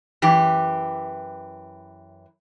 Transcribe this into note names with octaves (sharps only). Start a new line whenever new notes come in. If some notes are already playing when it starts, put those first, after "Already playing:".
F#2 E3 G4